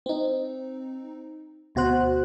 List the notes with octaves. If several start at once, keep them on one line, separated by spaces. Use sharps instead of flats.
C4 D#4
D2 B2 F#4 C5 F#6